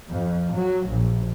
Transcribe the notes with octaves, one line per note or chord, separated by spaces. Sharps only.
F2
F#3
A#1